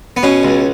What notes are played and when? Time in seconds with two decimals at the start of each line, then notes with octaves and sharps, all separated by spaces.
0.17 B3
0.23 B2 C#4
0.43 C#2